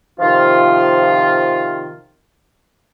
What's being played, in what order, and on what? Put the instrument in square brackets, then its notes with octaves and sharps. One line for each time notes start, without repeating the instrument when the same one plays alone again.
[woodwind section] C3 D#3 F3 F4